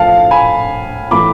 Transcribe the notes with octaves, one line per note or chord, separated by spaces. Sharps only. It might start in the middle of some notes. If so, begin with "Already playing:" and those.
Already playing: A2 F3 F5 A5
G#5 B5
A2 E3 B5 D6